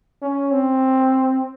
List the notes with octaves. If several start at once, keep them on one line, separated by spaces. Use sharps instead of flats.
C#4
C4